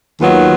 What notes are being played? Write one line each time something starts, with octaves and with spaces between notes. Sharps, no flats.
D#2 D#3 F#3 B3 F4